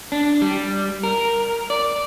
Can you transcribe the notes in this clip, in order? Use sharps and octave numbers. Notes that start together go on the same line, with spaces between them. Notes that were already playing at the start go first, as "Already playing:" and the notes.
D4
G3
A#4
D5